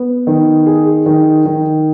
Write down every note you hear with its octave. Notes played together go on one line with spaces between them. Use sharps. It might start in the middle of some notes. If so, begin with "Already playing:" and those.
Already playing: B3
D#3
G#4
D#3
D#3